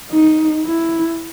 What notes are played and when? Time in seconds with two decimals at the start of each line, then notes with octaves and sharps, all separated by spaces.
0.11 D#4
0.65 E4